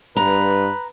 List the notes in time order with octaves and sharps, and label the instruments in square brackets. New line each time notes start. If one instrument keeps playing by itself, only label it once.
[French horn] G2 [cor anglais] B4 [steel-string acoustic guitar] A#5